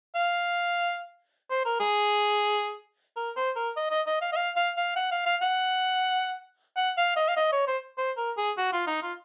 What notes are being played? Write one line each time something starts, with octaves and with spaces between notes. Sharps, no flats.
F5
C5
A#4
G#4
A#4
C5
A#4
D#5
D#5
D#5
F5
D#5
F5
F5
F5
F#5
F5
F5
F#5
F#5
F5
D#5
F5
D#5
C#5
C5
C5
A#4
G#4
F#4
F4
D#4
F4